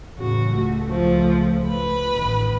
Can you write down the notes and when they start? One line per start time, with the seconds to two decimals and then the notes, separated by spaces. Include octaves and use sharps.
0.19 E2 A2 C#3 F#4
0.48 C#2 A3
0.90 F3
1.68 B4 B5
2.11 A1 D#3